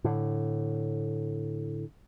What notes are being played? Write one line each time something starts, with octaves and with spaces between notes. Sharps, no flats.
A2 D3